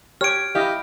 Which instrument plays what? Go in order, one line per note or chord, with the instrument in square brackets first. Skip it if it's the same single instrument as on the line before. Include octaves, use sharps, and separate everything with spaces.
[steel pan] G4 C#5 [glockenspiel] F6 D7
[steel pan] E4 D#5 F5 [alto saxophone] G4